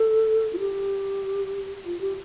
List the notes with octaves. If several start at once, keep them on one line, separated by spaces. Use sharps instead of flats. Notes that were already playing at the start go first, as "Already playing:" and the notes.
Already playing: A4
F4
G4
F4
G4